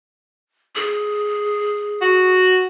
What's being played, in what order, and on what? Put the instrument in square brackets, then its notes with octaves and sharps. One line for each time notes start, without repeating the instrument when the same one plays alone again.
[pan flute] G#4
[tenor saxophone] F#4